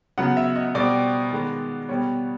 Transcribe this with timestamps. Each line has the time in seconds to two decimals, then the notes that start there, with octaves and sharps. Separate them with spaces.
0.18 C#3 F#3 B3 F#5
0.37 E5
0.56 D#5
0.75 B2 G3 C4 D5
1.32 D#3 G#3 B3
1.89 B2 G3 B3 C#5